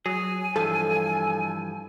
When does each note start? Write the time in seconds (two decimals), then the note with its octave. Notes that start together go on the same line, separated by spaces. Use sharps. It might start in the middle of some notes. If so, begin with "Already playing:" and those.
0.06 F#3 G#4 G#5
0.56 G2 E3 F3 A4